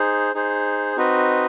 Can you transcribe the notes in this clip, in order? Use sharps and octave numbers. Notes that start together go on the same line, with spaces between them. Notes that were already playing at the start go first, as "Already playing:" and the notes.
Already playing: D#4 G#4 C5
D#4 G#4 C5
C4 D#4 F#4 B4 D#5